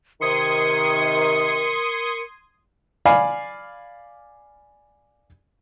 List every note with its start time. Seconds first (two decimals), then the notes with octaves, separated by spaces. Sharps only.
0.21 C3 D#3 A#4 C6 D#6 G#6 C#7
3.05 D5 F5 G#5 B5